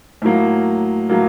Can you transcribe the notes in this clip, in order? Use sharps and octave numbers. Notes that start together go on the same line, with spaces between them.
A2 F#3 A#3
A2 F#3 A#3